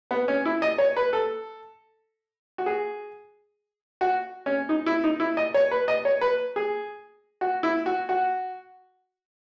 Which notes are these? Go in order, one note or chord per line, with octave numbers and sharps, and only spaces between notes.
B3
C#4
E4
D#5
C#5
B4
A4
F#4
G#4
F#4
C#4
D#4
E4
D#4
E4
D#5
C#5
B4
D#5
C#5
B4
G#4
F#4
E4
F#4
F#4